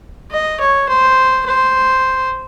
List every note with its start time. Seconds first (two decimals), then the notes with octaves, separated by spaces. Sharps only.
0.31 D#5
0.60 C#5
0.89 C5
1.46 C5